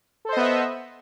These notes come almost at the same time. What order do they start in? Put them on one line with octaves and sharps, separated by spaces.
A4 C5 D#5 B3 E5